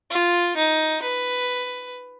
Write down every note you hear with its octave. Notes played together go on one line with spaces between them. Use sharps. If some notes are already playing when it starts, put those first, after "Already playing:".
F4
D#4
B4